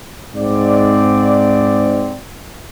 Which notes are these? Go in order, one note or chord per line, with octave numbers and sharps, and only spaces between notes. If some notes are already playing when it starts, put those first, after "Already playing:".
G#2 C4 D5